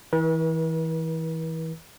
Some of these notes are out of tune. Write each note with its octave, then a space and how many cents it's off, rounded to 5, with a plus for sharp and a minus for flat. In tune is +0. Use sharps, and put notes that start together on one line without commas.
E3 -25 B4 -45